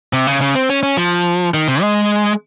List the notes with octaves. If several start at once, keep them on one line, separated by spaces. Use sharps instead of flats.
C3
C#3
C#3
C4
C#4
C#4
F3
D#3
C3
G#3